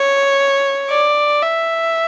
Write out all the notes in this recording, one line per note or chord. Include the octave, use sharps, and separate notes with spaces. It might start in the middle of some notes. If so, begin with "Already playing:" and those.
Already playing: C#5
D5
E5